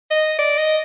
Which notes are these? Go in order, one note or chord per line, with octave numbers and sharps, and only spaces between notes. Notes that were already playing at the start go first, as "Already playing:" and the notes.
D#5
D5
D#5